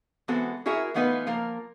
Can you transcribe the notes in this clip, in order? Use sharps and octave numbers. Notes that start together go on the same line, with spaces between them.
E3 G#3 B3 C4 F#4 A4
E4 F#4 G#4 A#4 E5
E3 A3 B3 D#4 F4 B4
F3 A#3 A#4